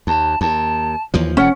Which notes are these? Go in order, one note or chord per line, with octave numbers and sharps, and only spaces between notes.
D#2 A5
D#2 A5
D#2 E3 F3
F1 F2 C#4 F#5